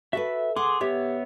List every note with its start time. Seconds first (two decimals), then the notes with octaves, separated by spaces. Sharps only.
0.13 F#4 A4 B4 E5
0.56 G#4 F#5 C6 D6
0.81 B3 G4 C#5 E5